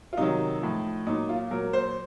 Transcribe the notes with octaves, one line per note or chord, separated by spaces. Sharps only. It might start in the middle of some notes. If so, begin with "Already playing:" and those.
F4
C3 D#3 F#3 D#4
A2 F3
A#2 F#3 D#4
F4
A#2 F#3 A#4
C5